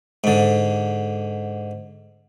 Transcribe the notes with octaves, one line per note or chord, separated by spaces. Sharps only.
G#2 D3